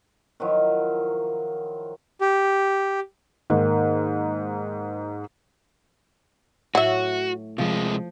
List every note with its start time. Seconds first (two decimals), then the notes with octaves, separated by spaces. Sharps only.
0.40 D#3 F3 F#3 E4
2.21 G4
3.50 G#2 D#3 A#3
6.75 A2 F#3 F#4 E5
7.58 C3 F3 G#3